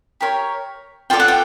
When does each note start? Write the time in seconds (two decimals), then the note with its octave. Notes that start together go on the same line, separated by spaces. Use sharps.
0.21 G4 A#4 C#5
1.10 F4 A4 D5 G5
1.20 F#5
1.28 G5